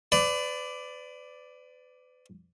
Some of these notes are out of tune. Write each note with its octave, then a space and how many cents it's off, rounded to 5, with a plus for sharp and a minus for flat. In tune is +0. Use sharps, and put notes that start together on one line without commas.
B4 +35 D5 +0